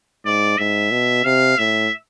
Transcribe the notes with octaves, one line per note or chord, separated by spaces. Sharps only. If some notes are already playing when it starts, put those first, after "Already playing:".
G#2 D5
G#2 E5
B2
C3 F5
A2 E5